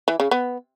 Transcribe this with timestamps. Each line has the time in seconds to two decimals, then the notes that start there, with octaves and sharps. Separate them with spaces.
0.08 E3
0.20 C#3
0.31 B3